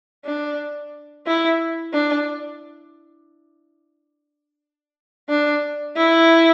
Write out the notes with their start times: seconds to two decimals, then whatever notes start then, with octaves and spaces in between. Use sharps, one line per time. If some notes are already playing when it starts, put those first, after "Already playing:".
0.25 D4
1.26 E4
1.93 D4
5.29 D4
5.96 E4